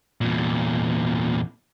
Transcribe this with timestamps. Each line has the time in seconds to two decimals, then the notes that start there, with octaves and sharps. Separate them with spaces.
0.21 E2 A#2